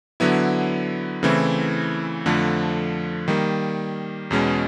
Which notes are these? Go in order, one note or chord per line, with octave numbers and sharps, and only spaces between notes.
D3 F#3 B3 E4
C#3 E3 A3 C4 E4
F2 D3 F3 A3
D#3 G3 A#3
E2 B2 G#3 C#4